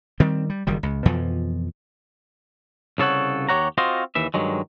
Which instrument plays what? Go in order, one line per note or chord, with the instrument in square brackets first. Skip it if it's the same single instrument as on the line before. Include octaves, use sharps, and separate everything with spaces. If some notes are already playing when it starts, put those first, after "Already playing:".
[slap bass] D#3 G3 C4
G3
F#1 D#3 G3
C#2
F2 B2 E3 F3
[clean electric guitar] C2 C#3 A4 C#5 F#5
D#2 G4 C#5 F#5 A#5
C4 F4 F#4 C5 D#5
D#2 E3 E5
G2 D#3 F#3 G#3